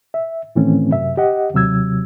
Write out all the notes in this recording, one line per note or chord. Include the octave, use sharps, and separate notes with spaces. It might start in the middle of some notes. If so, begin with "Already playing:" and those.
E5
A2 D#3 E3 A3 C4 C#4
F#2 C3 E5
G4 D#5 F#5
D#2 C3 F#3 E6 G#6